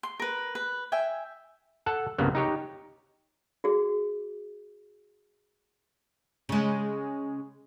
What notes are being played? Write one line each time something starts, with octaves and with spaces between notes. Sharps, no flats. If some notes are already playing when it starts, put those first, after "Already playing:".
C6
A#4 B4
B4
E5 G5 G#5
A4 F#5 A5
C2 G2 C#3 A#3 B3
D#4 G4 C#5
F#4 G#4
C#3 G#3